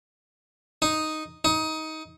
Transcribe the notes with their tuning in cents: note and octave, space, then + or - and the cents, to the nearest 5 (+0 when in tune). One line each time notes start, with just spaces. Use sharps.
D#4 +0
D#4 +20